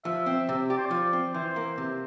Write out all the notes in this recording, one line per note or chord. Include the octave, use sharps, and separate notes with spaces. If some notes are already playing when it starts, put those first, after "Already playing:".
F3 E5
C4
C3
G4 D5
C5
D5
F3
C4
E3 C5
A#3
C3